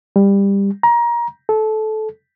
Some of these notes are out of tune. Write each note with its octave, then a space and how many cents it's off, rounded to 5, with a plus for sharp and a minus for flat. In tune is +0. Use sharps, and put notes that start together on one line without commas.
G3 +20
A#5 +25
A4 -20